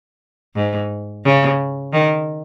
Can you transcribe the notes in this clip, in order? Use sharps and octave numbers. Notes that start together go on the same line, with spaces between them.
G#2
C#3
D#3